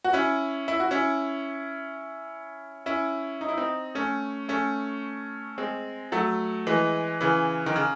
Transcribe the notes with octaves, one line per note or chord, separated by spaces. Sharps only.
F#4
C#4 E4
E4
F#4
C#4 E4
C#4 E4
D#4
E4
C4 D#4
A3 C#4
A3 C#4
G#3 C4
F#3 A3
E3 G#3
C#3 E3
D#3
C#3